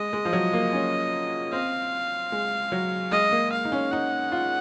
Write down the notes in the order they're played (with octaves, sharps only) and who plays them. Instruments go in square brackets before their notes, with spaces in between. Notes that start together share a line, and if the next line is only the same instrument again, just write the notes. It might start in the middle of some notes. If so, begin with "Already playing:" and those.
Already playing: [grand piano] G#3 [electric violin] D#5
[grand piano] G#3
F3
F#3
A#3
C#4
[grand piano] C4 [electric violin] F5
[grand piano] G#3
F#3
[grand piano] G#3 [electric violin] D#5
[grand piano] A#3
[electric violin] F5
[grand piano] D#4
C#4
[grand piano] D#4 [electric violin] F#5
[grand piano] F4